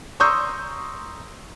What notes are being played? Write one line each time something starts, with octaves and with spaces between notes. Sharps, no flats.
A#5 C6 C#6 D#6 E6 G6